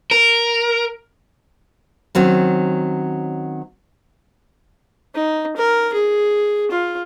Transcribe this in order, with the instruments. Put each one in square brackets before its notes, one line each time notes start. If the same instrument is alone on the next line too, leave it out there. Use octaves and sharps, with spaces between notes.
[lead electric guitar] A#4
[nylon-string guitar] D#3 F#3 C4 C#4
[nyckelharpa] D#4
A#4
G#4
F4